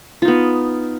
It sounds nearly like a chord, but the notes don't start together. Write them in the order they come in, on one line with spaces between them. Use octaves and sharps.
F4 D#4 B3